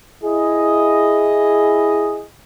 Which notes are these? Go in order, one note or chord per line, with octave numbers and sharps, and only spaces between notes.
E4 G#4 D#5